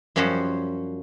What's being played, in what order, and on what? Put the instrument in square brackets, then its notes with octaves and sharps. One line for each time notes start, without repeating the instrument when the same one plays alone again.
[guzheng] F#2 F3 G3 C#4 F#4 C5